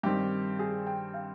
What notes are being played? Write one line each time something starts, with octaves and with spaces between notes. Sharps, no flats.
G2 D#3 G3 C4 G4
G#4
G5
F5